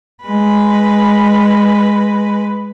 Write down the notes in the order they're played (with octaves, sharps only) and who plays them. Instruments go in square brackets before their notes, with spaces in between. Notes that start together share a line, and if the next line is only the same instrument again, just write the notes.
[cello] G#3 B4